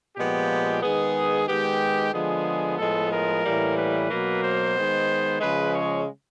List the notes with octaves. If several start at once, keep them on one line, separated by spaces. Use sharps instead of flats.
A#2 F3 G#3 B3 G4
D#3 G#3 B3 G#4
D#3 G#3 B3 G4
D3 F3 G#3 B3 G#4
A2 F3 G#3 B3 A4
A#4
A2 E3 G3 A#3
B4
B2 F#3 A#3
C5
D#3 G#3 B3
C#3 F3 G#3 B4
C#5